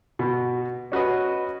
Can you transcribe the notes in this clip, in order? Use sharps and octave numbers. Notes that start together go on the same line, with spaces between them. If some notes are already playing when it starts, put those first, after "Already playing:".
B2 F#4
C#4 F#4 B4 D#5